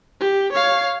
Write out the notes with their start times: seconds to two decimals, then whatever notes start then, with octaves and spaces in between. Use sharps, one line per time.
0.21 G4
0.52 C#5 F5